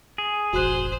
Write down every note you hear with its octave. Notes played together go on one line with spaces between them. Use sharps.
G#4
E1 A1 F#4 C5 F#6